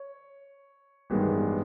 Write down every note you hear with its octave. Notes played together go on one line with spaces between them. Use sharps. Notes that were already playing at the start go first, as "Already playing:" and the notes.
Already playing: C#5
A1 G2 D#3 G#3 B3